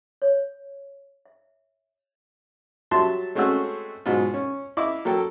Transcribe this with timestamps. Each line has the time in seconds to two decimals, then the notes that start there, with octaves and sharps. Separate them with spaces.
0.22 C#5
1.25 E5
2.91 F#3 G3 E5 A5 C6
3.35 G#3 A3 C4 C#4 F#4 E6
4.06 G#2 B2 F#3 F4
4.34 C#4
4.77 E4 D#5 F5 D6
5.05 F#3 A#3 A4 G5